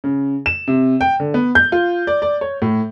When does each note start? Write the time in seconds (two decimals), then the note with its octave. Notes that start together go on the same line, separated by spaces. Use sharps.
0.04 C#3
0.46 E7
0.68 C3
1.01 G5
1.20 D3
1.34 B3
1.55 G6
1.72 F4
2.07 D5
2.22 D5
2.41 C#5
2.62 A2